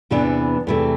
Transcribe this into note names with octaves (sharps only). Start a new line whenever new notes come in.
E2 C3 E3 B3 D4
E2 C3 E3 A3